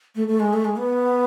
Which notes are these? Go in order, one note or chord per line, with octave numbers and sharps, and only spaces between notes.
A3
A3
G#3
A3
G#3
B3